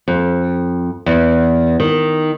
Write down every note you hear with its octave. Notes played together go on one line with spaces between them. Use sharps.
F2
E2
D#3